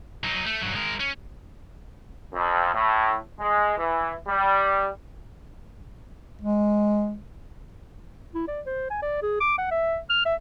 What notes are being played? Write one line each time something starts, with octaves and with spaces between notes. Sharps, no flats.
F#3 D#4
A3
G2 F#3
G#3 A#4
C#4
F2
A2
G#3
E3
G3
G#3
E4
D5
C5
G#5
D5
G#4
D6
F#5
E5
F6
E5